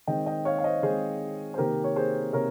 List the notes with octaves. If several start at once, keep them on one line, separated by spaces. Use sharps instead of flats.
D#3 G#3 C4 D#5 G5
D#5 G5
C#5 F5
F5
C5 D#5
D#3 G#3 C4 G#4 C5
C5
C3 D#3 A#3 G4 A#4
C#5
G#4 C5
C3 A#4 C#5